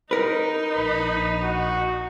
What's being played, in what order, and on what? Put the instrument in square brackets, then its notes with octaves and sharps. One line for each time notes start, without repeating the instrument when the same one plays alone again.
[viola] D#4 [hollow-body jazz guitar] A#4 B4
[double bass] A#1 [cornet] B5
[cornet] F#4